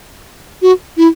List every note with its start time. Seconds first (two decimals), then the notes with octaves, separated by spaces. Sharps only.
0.62 F#4
0.97 E4